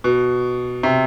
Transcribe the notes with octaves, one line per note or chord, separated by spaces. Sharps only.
B2
C3